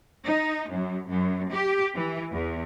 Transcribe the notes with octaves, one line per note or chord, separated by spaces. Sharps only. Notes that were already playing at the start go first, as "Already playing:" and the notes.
D#4
F#2
F#2
G4
E3
E2